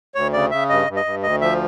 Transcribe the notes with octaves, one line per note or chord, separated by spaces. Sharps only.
D2 C#5
C#3 D5
C#3 E5
G2 D#5
G2
D#5
G2
D2 D#5
F3 E5